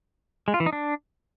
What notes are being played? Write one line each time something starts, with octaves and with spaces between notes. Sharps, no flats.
G#3
F4
E3
D#4
D4